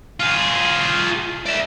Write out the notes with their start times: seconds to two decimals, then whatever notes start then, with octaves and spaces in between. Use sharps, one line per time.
0.20 F4 G#4
1.46 D5 E5